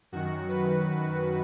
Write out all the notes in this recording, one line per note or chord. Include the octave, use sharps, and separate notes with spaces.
F#2 D#3 F#4
B4